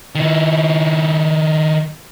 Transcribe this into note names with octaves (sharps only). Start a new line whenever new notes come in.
D#3 E4